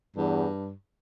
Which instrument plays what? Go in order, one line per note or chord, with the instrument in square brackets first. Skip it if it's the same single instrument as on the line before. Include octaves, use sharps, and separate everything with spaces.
[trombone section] E2 [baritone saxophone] G2